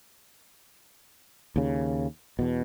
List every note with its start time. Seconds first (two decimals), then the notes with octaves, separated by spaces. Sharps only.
1.56 D#2 C#3
2.39 E2 B2